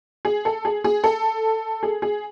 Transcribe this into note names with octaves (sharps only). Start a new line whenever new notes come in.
G#4
A4
G#4
G#4
A4
G#4
G#4